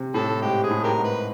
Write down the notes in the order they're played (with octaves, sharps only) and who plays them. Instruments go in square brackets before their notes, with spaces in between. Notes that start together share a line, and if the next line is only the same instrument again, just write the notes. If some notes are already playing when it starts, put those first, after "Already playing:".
Already playing: [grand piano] C3
[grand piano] A2 [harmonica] A4
[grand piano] G#2 [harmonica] G4
[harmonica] G#4
[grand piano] A2
[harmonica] G4 A#4
[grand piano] G#2
[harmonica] B4